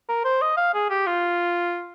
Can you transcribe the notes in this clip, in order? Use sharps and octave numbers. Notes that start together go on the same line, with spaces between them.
A#4
C5
D#5
F5
G#4
G4
F4